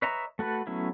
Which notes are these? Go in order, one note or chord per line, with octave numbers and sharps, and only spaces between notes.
B4 C#5 D#5 E5 A#5
A3 F#4 A4 B4
F#3 A3 B3 C#4 E4